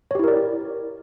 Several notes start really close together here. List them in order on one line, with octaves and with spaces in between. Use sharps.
C#5 G4 E4 A#4 D5